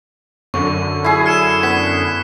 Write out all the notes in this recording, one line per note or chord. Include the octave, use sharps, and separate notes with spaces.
F#2 D3 C#6
E4 G#4
F6 C#7 E7
B3 B6